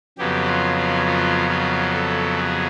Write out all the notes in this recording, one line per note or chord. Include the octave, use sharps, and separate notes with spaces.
F2 C#3 F#3 B3 G4
F4
F4
F4
F4
A4
G#4